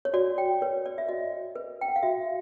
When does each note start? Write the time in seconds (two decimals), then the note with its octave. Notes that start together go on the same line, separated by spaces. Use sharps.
0.05 C#5
0.14 F#4 D5
0.38 G5
0.62 B4 C#5
0.86 D5
0.98 E5
1.09 F#4 D#5
1.56 B4
1.81 G5
1.88 F#5
1.96 F5
2.03 F#4 E5